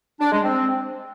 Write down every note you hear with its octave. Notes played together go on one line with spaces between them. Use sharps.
D4
G#3
C4